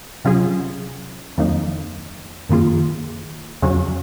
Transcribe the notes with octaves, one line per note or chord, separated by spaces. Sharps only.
C3 F#3 C#4 F4 G#4
F2 D#3 F#3 A#3 D#4
F#2 D#3 A#3 F4 G#4
F2 C#3 F#3 C#4 F#4